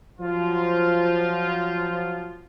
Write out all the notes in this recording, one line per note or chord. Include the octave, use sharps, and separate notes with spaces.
F3 F#3 F4